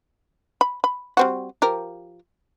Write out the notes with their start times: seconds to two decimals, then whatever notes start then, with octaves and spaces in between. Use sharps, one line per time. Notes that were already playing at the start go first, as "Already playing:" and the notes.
0.61 B5
0.84 B5
1.17 G3 C4 F#4
1.62 F3 G4 A#4